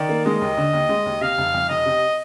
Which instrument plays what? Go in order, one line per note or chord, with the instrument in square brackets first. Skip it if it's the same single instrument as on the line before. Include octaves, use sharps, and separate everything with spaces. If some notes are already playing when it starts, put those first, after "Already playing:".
Already playing: [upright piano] D#3 [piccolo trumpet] D5
[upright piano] A#3
[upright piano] G#3 [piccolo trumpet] D#5
[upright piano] D#2
D3
D#2
G#3
D#2
[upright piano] C3 [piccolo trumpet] F5
[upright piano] F1
F2
[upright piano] F1 [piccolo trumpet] D#5
[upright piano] C3